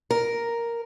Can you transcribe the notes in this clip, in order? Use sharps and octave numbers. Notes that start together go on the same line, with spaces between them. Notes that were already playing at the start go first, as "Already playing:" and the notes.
A#4